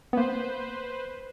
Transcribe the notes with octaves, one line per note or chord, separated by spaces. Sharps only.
A#3 B3 B4 C5